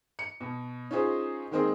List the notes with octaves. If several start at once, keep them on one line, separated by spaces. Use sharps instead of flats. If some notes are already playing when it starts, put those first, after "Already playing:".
C#7
B2
C#4 D#4 F4 G#4 C5
D#3 G#3 A#3 C4 D#4 G#4